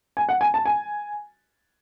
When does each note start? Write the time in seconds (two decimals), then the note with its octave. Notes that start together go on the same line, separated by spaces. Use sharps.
0.17 G#5
0.29 F#5
0.41 G#5
0.54 A5
0.66 G#5